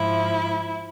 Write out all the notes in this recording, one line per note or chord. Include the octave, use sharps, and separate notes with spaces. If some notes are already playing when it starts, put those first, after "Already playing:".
Already playing: G#2 F3 E4